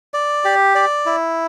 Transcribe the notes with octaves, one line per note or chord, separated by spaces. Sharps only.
D5
G4
D5
E4